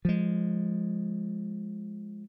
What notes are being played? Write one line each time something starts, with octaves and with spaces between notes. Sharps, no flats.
F3 G#3